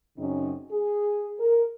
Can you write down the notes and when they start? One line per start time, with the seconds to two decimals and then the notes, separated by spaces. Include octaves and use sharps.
0.17 F#2 C#3 C4 C#4 D#4
0.72 G#4
1.39 A#4